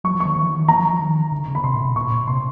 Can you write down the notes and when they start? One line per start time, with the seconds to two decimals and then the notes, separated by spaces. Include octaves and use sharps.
0.04 F#3 C#6
0.15 F3
0.20 C#6
0.25 D#3
0.36 D#3
0.44 E3
0.51 D#3
0.68 E3 A#5
0.79 F3
0.89 F3
1.00 D#3
1.32 D3
1.48 C#3
1.55 B5
1.64 C3 C6
1.74 A#2
1.85 B2
1.96 A#2 C#6
2.12 A#2
2.27 C3 C6